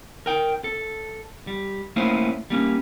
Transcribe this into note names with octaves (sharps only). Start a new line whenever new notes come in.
A#4 G5
A4
G3
A3 A#3 C#4 E4 B4 C5
G3 A#3 C#4